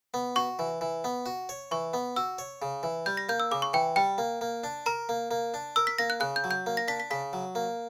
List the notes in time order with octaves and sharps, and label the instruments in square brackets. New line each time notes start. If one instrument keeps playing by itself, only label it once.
[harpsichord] B3
[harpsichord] F#4 [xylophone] C#6
[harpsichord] E3
E3
B3
F#4
C#5
[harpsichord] E3 [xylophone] C#6
[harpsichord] B3
[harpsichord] F#4 [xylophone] E6
[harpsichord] C#5
C#3
E3
[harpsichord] G3 [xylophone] G6
[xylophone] A#6
[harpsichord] A#3 [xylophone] G6
[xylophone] E6
[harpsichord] C#3 [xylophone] D6
[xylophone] C#6
[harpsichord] E3 [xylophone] G5
[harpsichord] G3 [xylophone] G5
[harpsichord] A#3
A#3
D4
[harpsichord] A#4 [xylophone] A#5
[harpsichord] A#3
A#3
D4
[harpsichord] A#4 [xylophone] E6
[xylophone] B6
[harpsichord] A#3 [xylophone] A#6
[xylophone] F#6
[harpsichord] C#3 [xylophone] F#6
[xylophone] G6
[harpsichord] F#3
[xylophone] G6
[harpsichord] A#3
[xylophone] A#6
[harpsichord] D4 [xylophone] B6
[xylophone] B6
[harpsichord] C#3 [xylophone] B6
[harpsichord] F#3
A#3